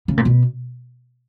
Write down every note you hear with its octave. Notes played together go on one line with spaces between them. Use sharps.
C#3
A#2
B2